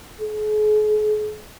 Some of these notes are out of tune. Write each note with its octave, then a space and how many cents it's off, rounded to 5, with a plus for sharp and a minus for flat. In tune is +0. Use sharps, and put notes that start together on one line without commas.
G#4 +45